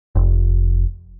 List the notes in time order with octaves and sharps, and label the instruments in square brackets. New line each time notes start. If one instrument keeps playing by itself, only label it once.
[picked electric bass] F1